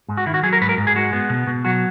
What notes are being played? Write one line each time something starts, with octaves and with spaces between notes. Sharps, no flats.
G#2
F#4
D#3 E4
F#4
F#3 G#4
A#4
G#2 B4
A#4
G#2
G#4
G#3 F#4
B3
B2
B2
F#3 F#4